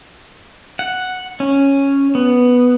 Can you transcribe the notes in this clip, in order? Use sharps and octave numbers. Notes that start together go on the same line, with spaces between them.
F#5
C#4
B3